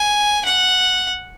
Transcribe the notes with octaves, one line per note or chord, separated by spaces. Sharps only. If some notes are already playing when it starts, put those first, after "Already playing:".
Already playing: G#5
F#5